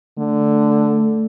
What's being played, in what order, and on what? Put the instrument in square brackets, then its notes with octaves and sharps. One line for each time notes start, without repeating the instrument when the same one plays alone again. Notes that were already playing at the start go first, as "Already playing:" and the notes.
[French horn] D3 [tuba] A3